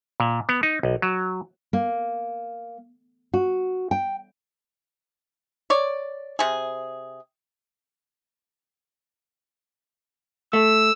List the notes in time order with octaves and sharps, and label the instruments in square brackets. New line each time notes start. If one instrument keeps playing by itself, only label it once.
[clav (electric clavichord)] A#2
B3
D#4
B1
F#3
[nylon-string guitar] A#3
F#4
G5
[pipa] C#5 D5
C3 G#4
[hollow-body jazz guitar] A3 [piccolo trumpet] E6